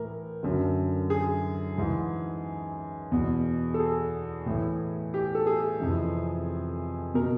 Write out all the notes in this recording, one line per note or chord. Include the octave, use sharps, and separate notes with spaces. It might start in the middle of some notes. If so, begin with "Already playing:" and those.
Already playing: A2 E3 A#4
F#2 D3
G#4
G#2 E3
E2 B2
A4
G#4
A2 E3
G4
A4
G#4
F2 C3 E3
B2 A#4